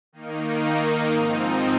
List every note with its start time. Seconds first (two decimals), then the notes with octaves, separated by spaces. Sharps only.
0.13 D#3 A#3 D#4
1.12 G#2 F3 C4 D#4